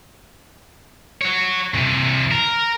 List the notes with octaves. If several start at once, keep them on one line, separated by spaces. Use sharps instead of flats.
C#5 F#5
C3 E3
A#4